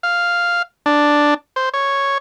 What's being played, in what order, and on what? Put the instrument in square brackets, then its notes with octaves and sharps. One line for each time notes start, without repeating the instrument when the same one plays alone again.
[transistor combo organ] F5
D4
C5
C#5